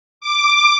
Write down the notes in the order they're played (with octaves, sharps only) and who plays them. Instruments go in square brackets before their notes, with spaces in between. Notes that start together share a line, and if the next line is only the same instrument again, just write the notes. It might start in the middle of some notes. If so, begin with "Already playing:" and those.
[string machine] D6